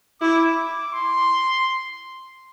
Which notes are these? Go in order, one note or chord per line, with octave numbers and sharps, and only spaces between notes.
E4 D6
D6
C6